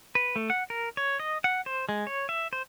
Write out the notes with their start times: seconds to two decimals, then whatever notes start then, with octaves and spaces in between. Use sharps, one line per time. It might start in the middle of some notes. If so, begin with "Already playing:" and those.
0.15 B4
0.36 A3
0.50 F#5
0.70 A#4
0.97 C#5
1.20 D#5
1.44 F#5
1.66 C5
1.89 G#3
2.07 C#5
2.29 E5
2.53 C5